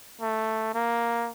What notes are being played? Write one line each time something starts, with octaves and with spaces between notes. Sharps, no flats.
A3
A#3